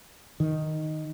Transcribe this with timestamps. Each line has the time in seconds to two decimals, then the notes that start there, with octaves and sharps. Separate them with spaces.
0.40 D#3